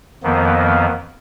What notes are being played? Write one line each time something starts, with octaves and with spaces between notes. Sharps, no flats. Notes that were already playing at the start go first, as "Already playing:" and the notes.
F2 D#3 F3 A#3 B3